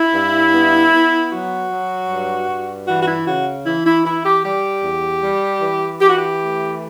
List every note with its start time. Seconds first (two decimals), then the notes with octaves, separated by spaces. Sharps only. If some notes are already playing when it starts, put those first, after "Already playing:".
Already playing: E4
0.13 G2
0.53 B3
0.92 B3
1.32 F#3 F#4
1.71 F#3
2.10 G2
2.49 G2
2.88 E3 F#4
3.03 F#4
3.08 E4
3.27 C#3 F#4
3.66 E3 E4
3.86 E4
4.05 E3 E4
4.25 G4
4.44 G3 G4
4.84 E2
5.23 G3
5.62 E3
6.01 E3 G4
6.09 F#4
6.18 G4
6.41 A3